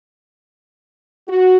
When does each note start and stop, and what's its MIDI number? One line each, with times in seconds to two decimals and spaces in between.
1.28 1.58 66